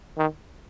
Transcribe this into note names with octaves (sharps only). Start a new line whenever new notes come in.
D#3